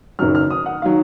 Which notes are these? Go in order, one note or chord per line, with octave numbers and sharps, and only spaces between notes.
F#1 F#2 D#3 F#3 F6
F6
D#6
F#5
D#3 F#3 F5